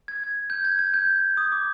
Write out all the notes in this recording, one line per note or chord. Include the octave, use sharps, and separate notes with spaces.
G#6
G#6
G6
G#6
G#6
G6
D#6
D6